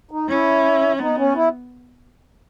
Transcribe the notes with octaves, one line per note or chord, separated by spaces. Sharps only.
D#4
C#4 E4
B3 D#4
C#4
E4